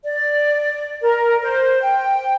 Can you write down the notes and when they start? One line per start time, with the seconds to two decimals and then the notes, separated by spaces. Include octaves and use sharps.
0.04 D5
1.02 A#4
1.42 C5
1.82 G5